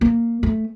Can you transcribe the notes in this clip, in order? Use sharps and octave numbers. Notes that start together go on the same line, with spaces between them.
A#3
A3